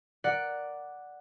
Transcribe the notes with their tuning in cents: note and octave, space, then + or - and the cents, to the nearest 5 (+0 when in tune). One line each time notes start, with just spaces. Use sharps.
A#4 +0 D5 +0 F#5 +0